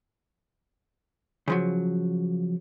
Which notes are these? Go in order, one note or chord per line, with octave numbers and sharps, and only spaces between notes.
C#3 F3 F#3